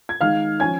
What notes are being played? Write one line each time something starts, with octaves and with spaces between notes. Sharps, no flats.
G#6
D#3 G#3 D#4 F5 F6
F3 C#4 G#5 G#6